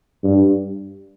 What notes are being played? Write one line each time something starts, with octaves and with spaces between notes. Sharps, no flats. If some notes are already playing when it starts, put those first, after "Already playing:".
G2